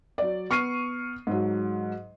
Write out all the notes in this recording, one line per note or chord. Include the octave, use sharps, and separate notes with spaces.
F#3 D5
B3 C#6 F6 C7 D#7
G#2 F#3